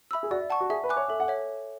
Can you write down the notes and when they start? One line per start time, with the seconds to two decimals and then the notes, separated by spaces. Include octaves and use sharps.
0.11 E5 B5 E6
0.23 G#4
0.31 F#4 D5
0.41 E5
0.50 F#5 A5 C#6
0.60 F#4
0.70 G#4 E5
0.84 B4
0.89 G#5 D6 F#6
0.97 C#5
1.08 A4 E5
1.20 F#5
1.28 C#5 E5